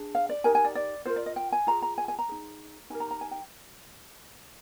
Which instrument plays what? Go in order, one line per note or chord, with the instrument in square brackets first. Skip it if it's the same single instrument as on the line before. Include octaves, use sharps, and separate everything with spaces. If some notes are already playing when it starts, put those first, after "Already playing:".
Already playing: [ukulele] D4 G#4
F5
D5
D#4 G4 A#4 G#5
G#5
D5
D5
F4 A#4 C5
D5
D#5
G5
G#5
F4 G#4 A#5
A#5
G#5
G#5
A#5
D#4 G#4
D#4 G4 A#4 G#5
A#5
A#5
G#5
G5